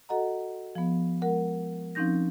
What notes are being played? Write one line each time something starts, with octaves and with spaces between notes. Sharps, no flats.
F#4 A4 D#5 F#5 A#5
F3 B3
G#3 A#4 F#5
F3 C4 C#4 D#4 G6 A#6